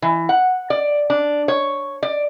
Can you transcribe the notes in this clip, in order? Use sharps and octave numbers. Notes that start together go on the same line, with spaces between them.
E3
F#5
D5
D4
C#5
D5